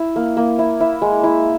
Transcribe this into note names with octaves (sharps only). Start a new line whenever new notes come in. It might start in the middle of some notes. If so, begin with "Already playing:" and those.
Already playing: E4
A#3
A#3
E4
E4
G#3
E4